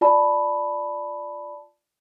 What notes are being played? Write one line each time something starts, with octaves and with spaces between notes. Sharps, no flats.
F4 D5 A5 B5